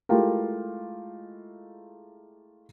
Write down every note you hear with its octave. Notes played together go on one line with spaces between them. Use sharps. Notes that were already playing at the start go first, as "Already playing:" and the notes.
G#3 A3 E4 F4 G4 A#4